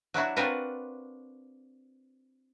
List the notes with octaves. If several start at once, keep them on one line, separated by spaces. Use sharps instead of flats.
F#3 D4 E4 F#4
C4 D4 F4 F#4 A#4 B4